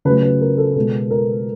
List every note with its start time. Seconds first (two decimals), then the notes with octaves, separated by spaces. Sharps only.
0.05 C#3 F#3 A3 B4
0.23 B4
0.41 A#4
0.58 A4
0.76 B2 G#3 A4
1.11 A#4